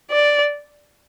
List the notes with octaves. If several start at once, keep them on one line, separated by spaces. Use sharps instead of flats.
D5